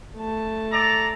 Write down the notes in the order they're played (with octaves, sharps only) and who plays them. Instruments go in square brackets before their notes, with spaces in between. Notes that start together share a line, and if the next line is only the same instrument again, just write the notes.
[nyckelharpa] A3 A5
[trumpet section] A4 D5 A#5